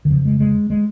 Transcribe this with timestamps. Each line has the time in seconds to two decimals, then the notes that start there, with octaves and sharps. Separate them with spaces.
0.05 D#3
0.10 F2 C#3 F3
0.25 G#3
0.40 G#3
0.70 G#3